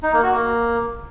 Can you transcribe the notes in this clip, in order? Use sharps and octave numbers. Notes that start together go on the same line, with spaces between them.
D#4
A#3
F#4
A#3